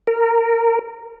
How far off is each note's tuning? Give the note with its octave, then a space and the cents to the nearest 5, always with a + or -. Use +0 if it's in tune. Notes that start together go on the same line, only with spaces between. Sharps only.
A#4 -20